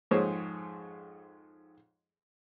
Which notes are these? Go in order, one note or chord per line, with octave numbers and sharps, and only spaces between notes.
F2 G#2 G#4 C5 C#5